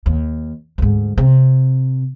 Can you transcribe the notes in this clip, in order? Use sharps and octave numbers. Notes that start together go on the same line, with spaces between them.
D#2
D2 G#2
C3